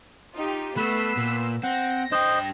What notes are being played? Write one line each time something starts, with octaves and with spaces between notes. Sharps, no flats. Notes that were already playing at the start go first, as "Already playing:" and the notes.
D#4 F4 G4
A3 B3 B4 B5 E6 C7
A#2
C4 F#5 A#6
D4 C5 D#5 G5